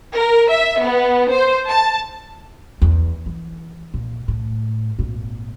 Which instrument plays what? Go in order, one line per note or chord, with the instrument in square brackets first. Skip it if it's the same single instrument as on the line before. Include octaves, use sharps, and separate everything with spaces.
[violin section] A#4
E5
B3
C5
A5
[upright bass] E2
E3
A#2
A2
G#1 A#2